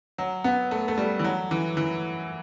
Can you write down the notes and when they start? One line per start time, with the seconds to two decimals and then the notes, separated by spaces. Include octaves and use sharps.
0.18 F#3
0.44 B3
0.71 A3
0.88 A3
0.98 G3
1.19 E3
1.24 F#3
1.51 E3
1.77 E3